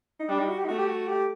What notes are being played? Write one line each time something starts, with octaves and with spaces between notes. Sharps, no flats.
D#4
G3 D4
D#4
F#4
G4
D#4
A3 F#4
G4
F#4
G4